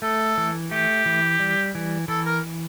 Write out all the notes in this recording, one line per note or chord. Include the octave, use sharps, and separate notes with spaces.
A3 A4
E3
A3 G4
E3
G3
E3
E3 A4
A#4